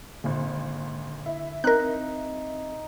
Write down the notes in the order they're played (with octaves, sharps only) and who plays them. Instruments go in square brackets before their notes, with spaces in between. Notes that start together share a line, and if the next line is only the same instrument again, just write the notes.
[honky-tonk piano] G#1 A#2 [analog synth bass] D3
[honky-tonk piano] E4
[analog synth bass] C4 [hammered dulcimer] D#4 [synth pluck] A#4 F#6